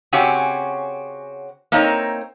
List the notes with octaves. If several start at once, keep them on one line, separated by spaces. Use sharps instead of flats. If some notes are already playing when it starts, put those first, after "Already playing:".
C#3 C4 C#4 F#4 G4 G#5
A#3 C4 D#4 C#5 D#5